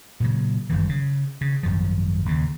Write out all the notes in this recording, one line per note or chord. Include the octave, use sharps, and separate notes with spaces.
A#2 C#3 F#3
G1 F#2 D#3 E3
C#3
C#3
G#1 F#2 F3
D#2 C#3